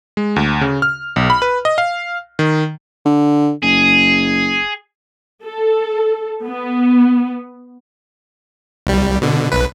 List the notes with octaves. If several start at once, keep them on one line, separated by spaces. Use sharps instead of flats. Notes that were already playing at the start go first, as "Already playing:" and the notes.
G#3
D2
C#3
F6
B1
B5
B4
D#5
F5
D#3
D3
F#1 G#4
A4
B3
C2 G3
B2 D3
B1 B4